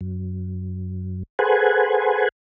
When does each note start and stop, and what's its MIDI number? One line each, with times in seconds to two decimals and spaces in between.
0.01 1.23 42
1.39 2.28 68
1.39 2.28 69
1.39 2.28 71
1.39 2.28 72
1.39 2.28 78
1.39 2.28 80